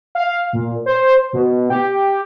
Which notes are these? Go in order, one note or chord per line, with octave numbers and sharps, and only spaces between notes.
F5
A#2
C5
B2
G4